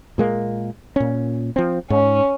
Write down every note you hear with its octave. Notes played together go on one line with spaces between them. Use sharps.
A#2 G#3 A#3
A#2 C#4
F3 C4
G#2 C#4